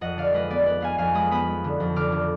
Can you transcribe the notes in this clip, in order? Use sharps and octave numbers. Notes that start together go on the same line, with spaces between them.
F2 D#5 F#5
D3 D5 F5
G#3 B4 D#5
B3 D5
B3 B4
B3 F5 G#5
F2 F5 G#5
G#3 B5 D#6
B3 B5 D#6
G#3
D3
F2
D3 D6 F6
D3